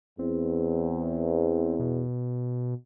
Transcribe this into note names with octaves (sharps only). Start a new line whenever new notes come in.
E2 C4
B2